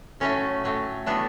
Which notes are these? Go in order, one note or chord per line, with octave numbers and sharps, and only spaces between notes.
A2 F#3 A3 C#4
A2 F#3 A3
A2 F#3 A3 B3 D4